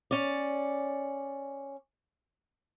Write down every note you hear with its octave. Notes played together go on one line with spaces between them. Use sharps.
C#4 D5